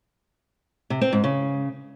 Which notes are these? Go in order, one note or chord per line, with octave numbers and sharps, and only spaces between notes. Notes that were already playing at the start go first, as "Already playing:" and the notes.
C3
C4
G#2
C#3